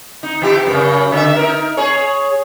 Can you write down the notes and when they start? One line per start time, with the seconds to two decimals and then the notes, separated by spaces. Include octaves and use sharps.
0.23 D#4
0.42 E3 E4 G4
0.67 F#2 C#3
1.12 D3 E5
1.36 D#4 A#4
1.77 G#4 C#5